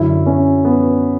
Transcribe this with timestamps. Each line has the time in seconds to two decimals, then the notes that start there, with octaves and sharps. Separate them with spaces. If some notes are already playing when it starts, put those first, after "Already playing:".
Already playing: F#2 D3 E4
0.26 C#4
0.65 B3